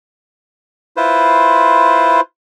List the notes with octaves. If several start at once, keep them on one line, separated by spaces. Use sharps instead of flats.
E4 F4 B4 C5